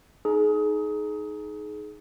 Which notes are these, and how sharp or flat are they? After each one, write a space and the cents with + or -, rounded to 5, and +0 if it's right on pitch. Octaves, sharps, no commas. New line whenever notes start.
D#4 +0 G#4 +30